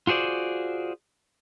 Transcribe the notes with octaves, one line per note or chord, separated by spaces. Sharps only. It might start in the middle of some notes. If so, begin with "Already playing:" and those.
F4 F#4 G#4 C5 D5